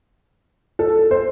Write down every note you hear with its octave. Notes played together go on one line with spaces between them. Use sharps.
A4
C5